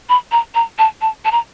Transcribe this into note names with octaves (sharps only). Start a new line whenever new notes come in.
B5
A#5
A#5
A5
A5
A5
A#5